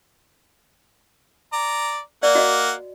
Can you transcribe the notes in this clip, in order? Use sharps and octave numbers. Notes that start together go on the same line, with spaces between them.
D5 A#5
A#3 D5 F#5
F#4 D#5